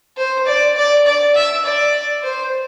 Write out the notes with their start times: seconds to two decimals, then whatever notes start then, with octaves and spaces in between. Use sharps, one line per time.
0.17 C5
0.46 D5
0.76 D5
1.06 D5
1.35 E5
1.64 D5
2.23 C5